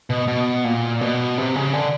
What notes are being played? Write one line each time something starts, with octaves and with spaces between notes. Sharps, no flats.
B2
B2
A#2
B2
C3
C#3
D3